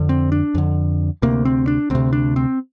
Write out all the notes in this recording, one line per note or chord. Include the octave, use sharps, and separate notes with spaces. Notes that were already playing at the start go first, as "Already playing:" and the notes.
Already playing: F2 D3
C4
D4
F2 D3
D2 C3 A#3
C4
D4
D2 C3 C4
D4
C4